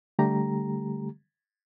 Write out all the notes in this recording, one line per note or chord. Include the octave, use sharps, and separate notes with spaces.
D3 G3 A3 G4 A#5